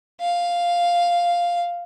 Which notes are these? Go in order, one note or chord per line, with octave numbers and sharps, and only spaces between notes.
F5